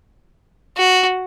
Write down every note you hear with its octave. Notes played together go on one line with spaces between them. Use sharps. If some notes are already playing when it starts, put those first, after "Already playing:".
F#4